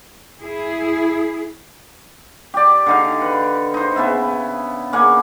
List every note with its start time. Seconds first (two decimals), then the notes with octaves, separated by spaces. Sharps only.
0.43 E4 G#4
2.54 G4 D5
2.86 D3 D#4 F5
3.22 B4
3.74 D#4 C5
3.96 C#3 B3 E4
4.93 C#3 A#3 F#5 G#5